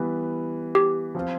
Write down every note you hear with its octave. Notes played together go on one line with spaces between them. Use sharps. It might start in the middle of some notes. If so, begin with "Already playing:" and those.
Already playing: E3 G3 B3 E4 B4
G4
F3 C4 F4